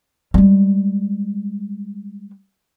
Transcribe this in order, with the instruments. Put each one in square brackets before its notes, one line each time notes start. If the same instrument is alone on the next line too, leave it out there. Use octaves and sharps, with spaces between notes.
[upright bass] G3 G#3